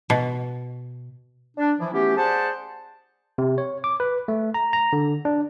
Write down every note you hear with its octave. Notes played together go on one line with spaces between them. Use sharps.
B2
D4
E3 F3 E4
E3 A3 B3 C#4 F#4 G4
G#4 C5 D5 F#5 A5
C3
C#5
D6
B4
A3
A#5
A#5
D3
D4